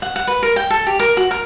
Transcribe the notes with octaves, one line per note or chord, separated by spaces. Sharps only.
F#5
F#5
B4
A#4
G5
A4
G4
A#4
F#4
A#4